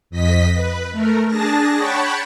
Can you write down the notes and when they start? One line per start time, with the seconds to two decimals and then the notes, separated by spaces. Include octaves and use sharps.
0.10 F2 D#5 B6
0.53 B4
0.92 A3 A#4
1.26 D4 G#4 A5 A#6
1.76 C#5 F#5 G5 A5 B5 C#6